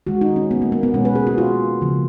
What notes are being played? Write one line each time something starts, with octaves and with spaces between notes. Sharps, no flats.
D#3 G#3 F#4
D#4
C#4
B3
A#3
A#3
B3
B2 G#3 C#4
B4
G#4
F#4
F4
C#3 F3 A#3